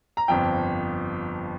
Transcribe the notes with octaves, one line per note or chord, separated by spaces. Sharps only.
A#5
G1 F2 F3 G5